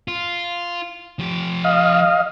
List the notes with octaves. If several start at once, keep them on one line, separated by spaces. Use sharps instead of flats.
F4
F3 G4
D#5 F5